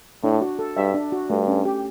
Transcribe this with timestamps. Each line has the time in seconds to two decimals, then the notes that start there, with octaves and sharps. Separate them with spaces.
0.23 A2 D4
0.41 F#4
0.59 A4
0.77 G2 E5
0.94 D4
1.12 F#4
1.30 G2 A3
1.47 C#4
1.65 G4